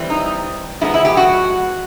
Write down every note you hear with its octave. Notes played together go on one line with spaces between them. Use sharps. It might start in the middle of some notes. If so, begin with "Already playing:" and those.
Already playing: E3 G3 C4
D#4
F3 G#3 B3 D#4 E4
E4
G4
F#4